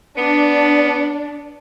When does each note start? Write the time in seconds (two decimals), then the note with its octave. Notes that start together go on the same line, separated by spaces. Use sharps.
0.18 B3 D4